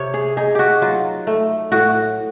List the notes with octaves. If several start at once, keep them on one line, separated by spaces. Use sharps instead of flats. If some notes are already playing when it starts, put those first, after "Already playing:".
Already playing: C3 C#5
G#4
D#4 G#4
F#4 G4
F#3 F4
A3
A2 F#4